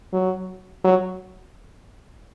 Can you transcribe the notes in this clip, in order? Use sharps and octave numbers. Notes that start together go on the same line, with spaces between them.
F#3
F#3